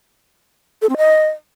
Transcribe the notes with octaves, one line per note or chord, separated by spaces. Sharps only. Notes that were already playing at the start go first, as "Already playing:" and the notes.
A4
C4
D#5